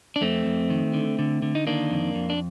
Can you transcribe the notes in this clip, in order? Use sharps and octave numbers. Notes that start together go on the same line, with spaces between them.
D4
F2 A3 C4
F2
D#3
D3
D3
D3
D#4
D#3 A#3 D4
F2
F2
D4